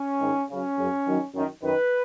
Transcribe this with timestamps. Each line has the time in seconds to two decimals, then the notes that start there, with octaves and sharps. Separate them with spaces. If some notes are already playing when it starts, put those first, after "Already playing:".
Already playing: C#4
0.21 G#2 D#3
0.49 F#2 C#3 C#4
0.77 F#2 C#3
1.07 F#2 D#3
1.35 F#2 D#3
1.62 F#2 D#3 B4